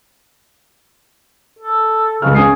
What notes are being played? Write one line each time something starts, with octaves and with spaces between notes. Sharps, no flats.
A4
C#2 C#3 G#4 F6
C#4 G#4 D#6 C7